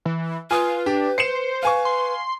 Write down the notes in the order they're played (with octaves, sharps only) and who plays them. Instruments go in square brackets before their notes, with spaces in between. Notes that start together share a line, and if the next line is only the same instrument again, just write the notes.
[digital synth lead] E3
[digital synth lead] F4 [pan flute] B4 [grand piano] G#5 D#6
[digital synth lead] D4 [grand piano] G4
[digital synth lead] C5 [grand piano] C7 C#7 E7
[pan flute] B4 [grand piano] F5 G#5 C#6
[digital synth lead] C6